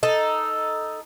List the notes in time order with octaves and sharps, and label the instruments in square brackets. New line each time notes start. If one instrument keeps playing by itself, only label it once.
[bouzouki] D#4 A4